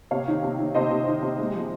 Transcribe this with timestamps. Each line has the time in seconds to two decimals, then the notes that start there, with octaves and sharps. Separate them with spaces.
0.11 C3 C#5 F5
0.28 D#3
0.43 C3
0.59 D#3
0.75 C3 C5 D#5
0.90 C3
1.08 D#3
1.22 C3
1.38 G#3
1.55 F3